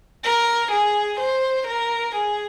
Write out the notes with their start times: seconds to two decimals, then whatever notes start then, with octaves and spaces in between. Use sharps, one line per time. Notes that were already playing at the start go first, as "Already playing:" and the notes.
0.24 A#4
0.71 G#4
1.20 C5
1.68 A#4
2.15 G#4